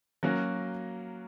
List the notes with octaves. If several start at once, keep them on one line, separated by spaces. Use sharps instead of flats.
F#3 A#3 C#4 F#4 A#4